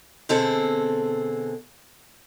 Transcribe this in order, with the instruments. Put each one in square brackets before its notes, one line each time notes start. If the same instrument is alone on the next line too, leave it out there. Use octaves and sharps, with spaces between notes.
[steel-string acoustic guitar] B2 D3 C4 G#4 A4